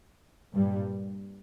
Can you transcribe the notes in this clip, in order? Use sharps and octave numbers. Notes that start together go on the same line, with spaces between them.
G2 A#2 G3